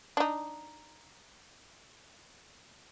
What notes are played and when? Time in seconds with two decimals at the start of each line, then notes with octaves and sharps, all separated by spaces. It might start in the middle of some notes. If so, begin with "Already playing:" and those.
0.17 D4 D#4